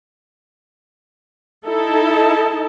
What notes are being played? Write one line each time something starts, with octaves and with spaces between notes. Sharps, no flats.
D#4 E4 A4 D#5 A5